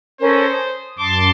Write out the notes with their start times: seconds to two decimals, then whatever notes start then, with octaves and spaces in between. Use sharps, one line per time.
0.21 C#4 A4 A#4 C5
0.53 D#6
0.98 F#2 A5 C6 D6